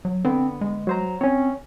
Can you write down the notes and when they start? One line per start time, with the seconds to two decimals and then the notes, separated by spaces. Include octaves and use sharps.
0.05 F#3
0.25 D3 B3 C4
0.61 G#3
0.87 F#3 C5 A#5
1.21 C4 C#4 C#5